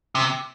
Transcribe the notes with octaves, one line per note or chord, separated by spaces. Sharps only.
C3